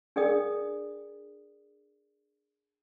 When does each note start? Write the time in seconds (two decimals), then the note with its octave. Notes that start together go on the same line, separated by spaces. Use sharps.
0.16 D4 G#4 A#4 D5 G5 D#6